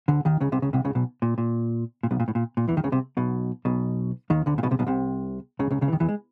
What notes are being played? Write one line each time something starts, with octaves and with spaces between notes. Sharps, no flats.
D2 D3
D#2 D#3
C#2 C#3
C2 C3
C#2 C#3
C2 C3
C#2 C#3
B1 B2
A#2
A#2
A#2
B1 B2
A#2
A2
A#2
A#2
E2 E3
D#2 D#3
C#2 C#3
C2 C3
B1 B2
B1 B2
D#2 D#3
D2 D3
A#2
B1 B2
C2 C3
B1 B2
C2 C3
C#2 C#3
C#2 C#3
C#2 C#3
E3
D#2 D#3
E2 E3
G#3